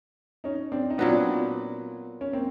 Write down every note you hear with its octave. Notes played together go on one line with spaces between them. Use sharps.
C#4 D#4
C4 D4
D#4
A#2 F#3 B3 C4 D4
C#4
A#3 C4